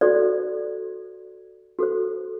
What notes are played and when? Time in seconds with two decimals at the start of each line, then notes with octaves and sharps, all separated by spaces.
0.01 F#4 A4 C5 D5
1.79 F#4 A4 C5